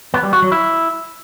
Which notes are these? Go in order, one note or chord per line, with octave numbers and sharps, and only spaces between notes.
B3
G3
F#4
F#3
E4